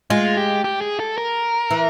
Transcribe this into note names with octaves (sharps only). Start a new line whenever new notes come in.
G#3 F4
G4
G4
G#4
A4
A#4
E3